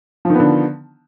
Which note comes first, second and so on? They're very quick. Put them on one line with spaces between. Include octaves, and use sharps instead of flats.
F3 D#3 B3 D3